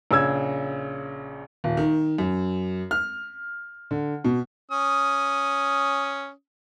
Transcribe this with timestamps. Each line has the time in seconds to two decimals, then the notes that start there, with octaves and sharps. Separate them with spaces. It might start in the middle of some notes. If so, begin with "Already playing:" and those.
0.11 A#1 C#3 E6 G#6
1.64 D#1
1.77 D#3
2.18 F#2
2.91 F6
3.91 D3
4.24 B2
4.71 C#4 D#6